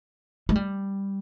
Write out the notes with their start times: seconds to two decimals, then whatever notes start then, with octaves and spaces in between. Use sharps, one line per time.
0.49 G#3
0.56 G3